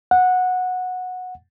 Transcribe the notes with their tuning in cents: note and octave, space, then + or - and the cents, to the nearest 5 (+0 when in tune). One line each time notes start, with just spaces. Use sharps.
F#5 -15